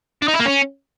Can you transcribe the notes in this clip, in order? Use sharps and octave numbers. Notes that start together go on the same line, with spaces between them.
D4
D#4
E4
A#3
C#4